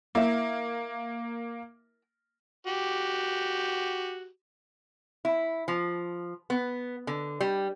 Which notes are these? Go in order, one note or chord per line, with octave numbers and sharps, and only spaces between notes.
A#3 E4 A#4 E5
F#4 G4
E4
F3
B3
D3
G3